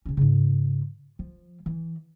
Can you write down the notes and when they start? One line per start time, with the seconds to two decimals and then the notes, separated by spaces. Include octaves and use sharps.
0.05 C3 C#4
0.17 G#2 C#3
1.19 F3
1.66 E3